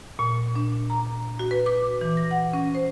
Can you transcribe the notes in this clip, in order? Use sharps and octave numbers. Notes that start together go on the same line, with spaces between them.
A#2
D4
A#5
F#4
B4
D6
E3
A#6
F#5
C#4
C5